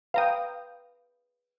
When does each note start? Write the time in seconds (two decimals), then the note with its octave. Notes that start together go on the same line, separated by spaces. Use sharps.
0.14 B4 F5 G5 A#5 D#6